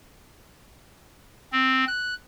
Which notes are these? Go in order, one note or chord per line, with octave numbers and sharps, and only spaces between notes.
C4
F#6